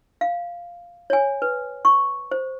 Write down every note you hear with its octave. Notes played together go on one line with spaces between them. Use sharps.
F5
C#5 G#5
B4
C#6
C5